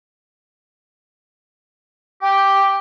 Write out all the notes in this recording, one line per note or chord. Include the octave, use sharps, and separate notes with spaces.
G4 G5